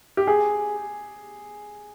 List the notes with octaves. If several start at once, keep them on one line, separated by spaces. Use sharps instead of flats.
G4
G#4